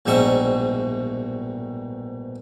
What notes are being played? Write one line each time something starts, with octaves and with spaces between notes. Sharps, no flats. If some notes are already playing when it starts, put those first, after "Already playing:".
A#1 G#2 B2 G3 E5 C#6